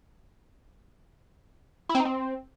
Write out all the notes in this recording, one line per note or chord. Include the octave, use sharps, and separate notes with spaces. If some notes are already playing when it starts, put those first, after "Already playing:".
E4
C4
D#4
C4